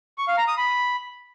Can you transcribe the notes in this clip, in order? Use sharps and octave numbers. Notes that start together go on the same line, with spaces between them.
C#6
F5
A#5
D#6
B5